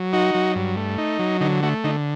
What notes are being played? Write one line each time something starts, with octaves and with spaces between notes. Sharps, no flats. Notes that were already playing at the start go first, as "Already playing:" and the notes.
Already playing: F#3
D#4 F#4
F#3
G2
A3
D#4
F#3
D3 D#4
A3 F#4
D3 D#4